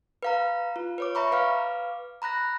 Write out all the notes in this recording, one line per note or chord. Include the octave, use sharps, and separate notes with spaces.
B4 F5 A#5
F4
B4 C#5 D6
E5 A#5 B5 C#6
B4 F5 D6 F6
A#5 B5 F#6 A#6